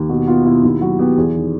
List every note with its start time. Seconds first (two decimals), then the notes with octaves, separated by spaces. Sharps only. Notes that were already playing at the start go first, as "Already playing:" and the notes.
Already playing: D#2
0.09 B2 F#4
0.27 B3 F4
0.45 B2 E4
0.63 D#2 E4
0.81 F#3 F#4
0.99 B3 G4
1.17 E2 G#4
1.35 D#3